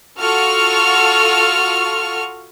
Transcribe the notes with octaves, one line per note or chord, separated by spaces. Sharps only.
F4 F#4 A4 C#6 F6